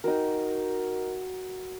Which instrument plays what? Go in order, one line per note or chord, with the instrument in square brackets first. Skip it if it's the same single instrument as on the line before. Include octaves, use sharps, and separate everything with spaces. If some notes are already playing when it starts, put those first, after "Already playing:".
[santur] D#4 F#4 A#4